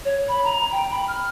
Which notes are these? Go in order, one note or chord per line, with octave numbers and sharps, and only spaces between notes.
C#5
B5
A#5
G5
B5
F6